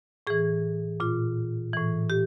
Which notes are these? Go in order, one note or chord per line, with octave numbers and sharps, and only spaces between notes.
A2 E3 G#4
A#2 F4
A2 E3
G4